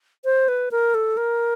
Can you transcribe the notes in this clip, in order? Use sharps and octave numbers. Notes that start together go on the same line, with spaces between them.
C5
B4
A#4
A4
A#4